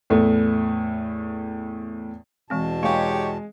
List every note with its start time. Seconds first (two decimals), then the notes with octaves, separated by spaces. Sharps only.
0.10 E2 A2 A3
2.50 E2 B2 E3 G#3 C4 A5
2.83 G#3 G4 C#5 F5